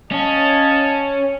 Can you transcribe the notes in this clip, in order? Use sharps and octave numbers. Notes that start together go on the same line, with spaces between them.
C#4 D#5 F5 A5